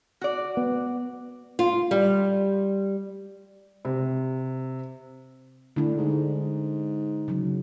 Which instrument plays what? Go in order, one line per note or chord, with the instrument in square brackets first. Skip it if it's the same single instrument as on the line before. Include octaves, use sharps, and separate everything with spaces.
[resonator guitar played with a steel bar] F#4 D5
[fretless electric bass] B3
[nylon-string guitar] F4
G3
[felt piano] C3
[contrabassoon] A2 [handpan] D3 D4
[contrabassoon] G#2
[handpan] C#3 F#3